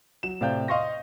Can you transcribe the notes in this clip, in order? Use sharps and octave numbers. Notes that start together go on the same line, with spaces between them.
F#3 E7
A2 C3 D5 F5 G5 G6
D#5 F5 C6 C#6 A#6